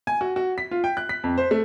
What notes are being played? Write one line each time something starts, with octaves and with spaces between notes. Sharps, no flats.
G#5
F#4
F#4
B6
F4
G5
F#6
B6
F2
C5
A3